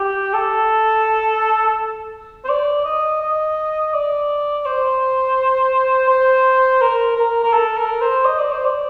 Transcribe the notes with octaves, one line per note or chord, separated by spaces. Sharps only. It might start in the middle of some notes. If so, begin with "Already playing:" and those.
Already playing: G4
A4
C5
D5
D#5
D#5
D5
C5
C5
A#4
A#4
A#4
A4
A#4
C5
D#5
D5
C5
D5